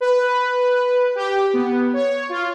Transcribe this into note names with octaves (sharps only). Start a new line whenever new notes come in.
B4
G4
B3
C#5
F4